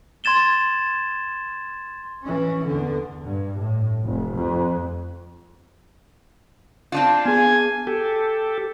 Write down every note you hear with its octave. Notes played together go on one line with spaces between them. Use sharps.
C6 G#6 A6 E7 G7
E3 C#4
E2 D3
G2
A2
F1
F2
C4 D4 F4
B3 G#4 G#5
G4 A4